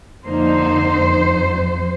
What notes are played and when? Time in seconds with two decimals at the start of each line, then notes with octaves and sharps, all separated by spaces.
0.24 F2 D3 F3 A#3 D#4 C5
1.02 F2